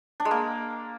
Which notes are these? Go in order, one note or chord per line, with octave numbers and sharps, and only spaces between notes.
D4
G#3
A#3